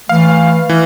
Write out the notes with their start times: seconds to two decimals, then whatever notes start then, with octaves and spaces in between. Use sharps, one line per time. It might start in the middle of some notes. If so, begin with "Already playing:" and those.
0.09 E3 A3 F5
0.69 E3